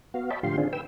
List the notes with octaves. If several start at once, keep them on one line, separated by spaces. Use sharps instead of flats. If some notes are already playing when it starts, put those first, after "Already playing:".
B3 F#4 F5
C#5 D#5 E5 G5 A5 B5
A2 D3 F3 G4 F5 C6
D3 D#3 C4 D4 F4 G#4
B4 G5 E6